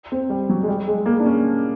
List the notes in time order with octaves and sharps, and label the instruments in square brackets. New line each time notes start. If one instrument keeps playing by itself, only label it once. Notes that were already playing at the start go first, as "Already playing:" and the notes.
[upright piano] C4
G3
F#3
G#3
G3
G#3
A#3
D4
C#4